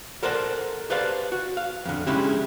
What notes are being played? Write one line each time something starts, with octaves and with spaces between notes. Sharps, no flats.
A4 A#4 C5 D5 F#5 A5
G4 B4 C5 D5 F5 A5
F#4
F5
F2 D3
C#3 G#3 C#4 D4 E4 G4